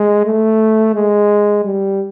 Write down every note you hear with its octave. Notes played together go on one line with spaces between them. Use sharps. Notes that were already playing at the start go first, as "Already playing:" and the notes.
Already playing: G#3
A3
G#3
G3